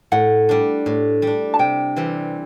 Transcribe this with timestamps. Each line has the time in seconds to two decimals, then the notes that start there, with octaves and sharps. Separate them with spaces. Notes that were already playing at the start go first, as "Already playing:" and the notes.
0.12 A2 F#5
0.49 G3 D4
0.86 A2
1.22 G3 D4
1.54 A5
1.59 C3 G5
1.96 E3 G3 C4